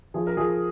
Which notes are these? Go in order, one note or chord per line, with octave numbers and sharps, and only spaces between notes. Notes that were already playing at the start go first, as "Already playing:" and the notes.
F3 G#4
A#4
F3 G#4